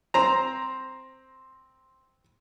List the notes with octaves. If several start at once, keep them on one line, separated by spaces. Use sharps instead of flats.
C4 C5 A#5